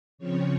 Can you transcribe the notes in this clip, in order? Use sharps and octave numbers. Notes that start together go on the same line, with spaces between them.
C#3 F3 C4 C#5